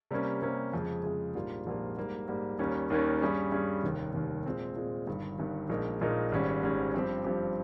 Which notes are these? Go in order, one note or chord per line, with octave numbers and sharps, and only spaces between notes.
C3 G3 A#3 C#4
C3 G3 A#3 C#4
F2 C#3 G#3
F2 C#3 G#3
A#1 G#2 G3 A#3 F4
A#1 G#2 G3 A#3 F4
G#2 G3 A#3
G#2 G3 A#3
D#2 D#3 G3 A#3 C#4
D#2 D#3 G3 A#3 C#4
G2 G3 C#4 G#4
G2 G3 C#4 G#4
F1 D#2 D#3
F1 D#2 D#3
A#2 G#3 C4
A#2 G#3 C4
G1 G2 D#3
G1 G2 D#3
A#1 A#2 G#3 D#4 A#4
A#1 A#2 G#3 D#4 A#4
G#1 G#2 G3 C#4
G#1 G#2 G3 C#4
G2 F3 C4 G4
G2 F3 C4 G4